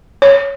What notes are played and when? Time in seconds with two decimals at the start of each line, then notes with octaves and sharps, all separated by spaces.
0.22 C#5